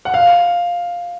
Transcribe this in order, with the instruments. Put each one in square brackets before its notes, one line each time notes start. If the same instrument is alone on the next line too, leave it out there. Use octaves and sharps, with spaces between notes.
[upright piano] F#5
F5